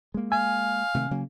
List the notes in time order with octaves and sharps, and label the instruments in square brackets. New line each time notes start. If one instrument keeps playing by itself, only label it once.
[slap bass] G#3 A#3
[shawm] F5 [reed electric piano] G#5
[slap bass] C3 D#3 A3
C#3 F#3 A#3